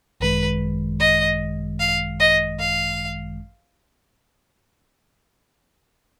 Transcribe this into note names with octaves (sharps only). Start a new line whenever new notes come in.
G#1 F#2 D#3 G#3 B4
D#5
F5
D#5
F5